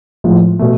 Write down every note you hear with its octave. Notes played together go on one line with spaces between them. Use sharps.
A2 F3 G#3
B2 A3